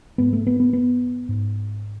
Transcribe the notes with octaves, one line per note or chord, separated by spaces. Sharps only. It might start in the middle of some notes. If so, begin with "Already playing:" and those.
G#2 B3
A3
B3
B3
B3
G#2